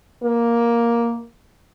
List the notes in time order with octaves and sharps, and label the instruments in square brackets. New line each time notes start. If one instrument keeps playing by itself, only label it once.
[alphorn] A#3